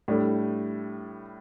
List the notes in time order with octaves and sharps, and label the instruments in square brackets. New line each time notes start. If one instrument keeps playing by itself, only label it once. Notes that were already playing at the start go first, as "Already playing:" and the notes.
[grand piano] A2 G3 D4 A4